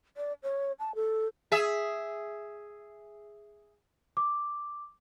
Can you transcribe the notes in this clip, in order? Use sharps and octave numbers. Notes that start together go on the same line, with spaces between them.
D5
C#5
A5
A4
G#4 E5
D6